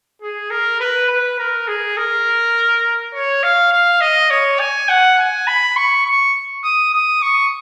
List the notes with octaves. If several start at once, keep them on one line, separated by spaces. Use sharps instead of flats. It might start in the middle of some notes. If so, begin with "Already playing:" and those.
G#4
A#4
B4
B4
A#4
G#4
A#4
C#5
F5
F5
D#5
C#5
G#5
F#5
G#5
B5
C#6
C#6
D#6
D#6
C#6